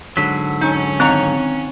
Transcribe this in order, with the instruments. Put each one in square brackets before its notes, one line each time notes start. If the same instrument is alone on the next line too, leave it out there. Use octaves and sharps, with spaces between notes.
[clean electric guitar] G#2 D3 F#3 [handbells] B6
[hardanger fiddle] C#4 [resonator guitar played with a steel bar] D#4
[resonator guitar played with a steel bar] D#3 C#5 A#5 [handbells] C4